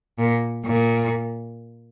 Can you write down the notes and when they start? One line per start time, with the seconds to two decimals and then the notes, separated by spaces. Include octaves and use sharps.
0.19 A#2
0.65 A#2